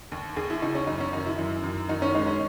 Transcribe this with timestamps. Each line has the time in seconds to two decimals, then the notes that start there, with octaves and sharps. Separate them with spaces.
0.12 D#2
0.36 D#2 G#4
0.50 E4
0.62 C#3 D#4
0.75 C#4
0.87 F#2 D#4
1.00 C#4
1.13 D#3 D#4
1.26 E4
1.39 F#2
1.64 F#2
1.89 D#3 D#4
2.02 C#4
2.15 G#3 D#4
2.27 C#4